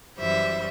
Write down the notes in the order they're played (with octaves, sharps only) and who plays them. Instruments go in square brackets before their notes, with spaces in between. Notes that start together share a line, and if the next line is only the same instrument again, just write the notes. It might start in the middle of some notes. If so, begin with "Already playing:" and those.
[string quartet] F#2 E3 G3 C5 E5